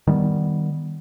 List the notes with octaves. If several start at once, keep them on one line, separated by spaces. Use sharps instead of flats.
D#3 G3 A#3 B3